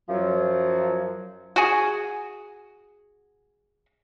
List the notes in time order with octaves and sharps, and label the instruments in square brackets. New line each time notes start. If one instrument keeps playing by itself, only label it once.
[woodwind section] F#2 F3 F#3
[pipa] F#4 G#4